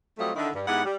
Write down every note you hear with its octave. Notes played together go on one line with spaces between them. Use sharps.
F#3 G3 A3 C4 F4 D#5
D3 D#3 E4
G2
G#2 B3 E4 G4 F#5
G3